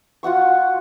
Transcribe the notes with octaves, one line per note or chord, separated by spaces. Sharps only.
F4 F#4 F#5 C#6